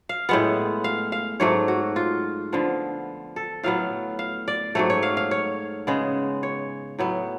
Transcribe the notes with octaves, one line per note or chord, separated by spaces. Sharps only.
F5
A2 G#3 B3 F#5
F5
F5
G#2 F#3 A3 C#5
F#4
F4
D3 F3 B3
A4
A2 F#3 B3 F5
F5
D5
G#2 F#3 A3 C#5
C#5
F5
F5
C#5
C#3 G#3 B3
C#5
A2 F#3 B3